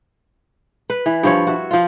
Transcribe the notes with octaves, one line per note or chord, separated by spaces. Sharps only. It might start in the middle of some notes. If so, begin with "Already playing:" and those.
B4
E3
G2 F3 C#5
F#4 E5
F3 F4